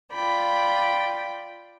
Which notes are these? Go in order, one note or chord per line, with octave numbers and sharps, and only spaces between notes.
F4 D5 G5 B5